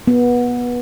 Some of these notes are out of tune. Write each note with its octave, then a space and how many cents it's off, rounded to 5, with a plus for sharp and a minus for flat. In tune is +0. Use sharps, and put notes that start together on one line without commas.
B3 -20